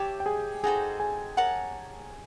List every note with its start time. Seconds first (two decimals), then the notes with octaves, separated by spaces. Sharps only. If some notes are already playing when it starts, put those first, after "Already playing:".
Already playing: G4 C#5 E5 G5 A5 D6
0.20 G5
0.26 G#4 G#5
0.64 D#4 F#4 G#4 A4 C5 G#5
1.00 G#4 G#5
1.37 A#4 C#5 F#5 A5